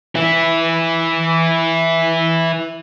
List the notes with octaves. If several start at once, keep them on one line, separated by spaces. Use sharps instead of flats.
E3 E4